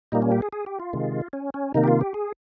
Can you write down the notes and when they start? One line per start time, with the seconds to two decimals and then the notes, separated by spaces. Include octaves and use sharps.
0.12 A#2 G3 A#3 D#4
0.22 C#4
0.32 G4
0.42 G#4
0.53 G#4
0.66 G4
0.80 F4
0.93 C3 D#3 G#3
1.33 C#4
1.54 C#4
1.74 C3 D#3 A#3 D#4
1.84 G4
1.88 F4
2.01 G4
2.14 G#4